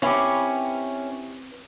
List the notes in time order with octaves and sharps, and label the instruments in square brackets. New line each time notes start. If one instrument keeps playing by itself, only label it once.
[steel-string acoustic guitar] C4 B4 C#5 [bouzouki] C#4 [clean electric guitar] E4 G4